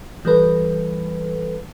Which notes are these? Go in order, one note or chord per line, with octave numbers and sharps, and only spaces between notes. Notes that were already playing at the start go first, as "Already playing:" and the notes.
E3 G3 A4 B4